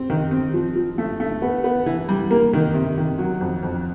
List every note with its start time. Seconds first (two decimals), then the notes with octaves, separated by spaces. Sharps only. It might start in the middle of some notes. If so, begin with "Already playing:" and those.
Already playing: C4
0.10 D#3
0.31 C4
0.53 F3
0.75 F3
0.98 A3
1.20 A3
1.42 B3
1.64 B3
1.86 E3
2.09 G3
2.31 A#3
2.53 D#3
2.74 C3
2.98 D#3
3.19 F#3
3.41 F2
3.63 F2